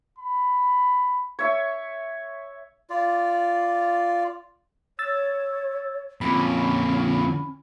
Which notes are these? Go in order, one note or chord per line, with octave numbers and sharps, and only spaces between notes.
B5
C#5 E5
F4 D5
C#5 E6 A6
F2 A#2 C#4 B5